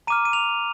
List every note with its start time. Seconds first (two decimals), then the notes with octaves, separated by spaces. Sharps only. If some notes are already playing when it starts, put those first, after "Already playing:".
0.07 A#5 D6 F6 D#7
0.25 D#7
0.33 F7